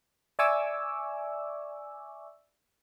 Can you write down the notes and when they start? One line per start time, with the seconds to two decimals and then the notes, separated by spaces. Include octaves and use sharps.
0.39 D5 E5 G#5 C#6 D6 E6